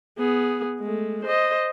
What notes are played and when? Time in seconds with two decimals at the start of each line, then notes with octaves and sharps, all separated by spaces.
0.18 B3 G#4
0.80 G#3 A3
1.25 C5 D#5